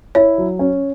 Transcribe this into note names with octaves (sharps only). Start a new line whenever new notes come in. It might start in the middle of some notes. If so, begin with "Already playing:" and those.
E4 C#5
F#3
C#4